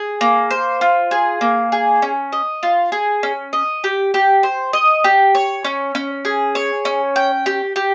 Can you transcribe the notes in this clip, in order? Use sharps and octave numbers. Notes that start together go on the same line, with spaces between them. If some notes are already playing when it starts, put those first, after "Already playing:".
Already playing: G#4
A#3
C5
F4
G#4
A#3
G#4
C#4
D#5
F4
G#4
C#4
D#5
G4
G4
C5
D#5
G4
C#5
C#4
C#4
G#4
C#5
C#4
G5
G4
G4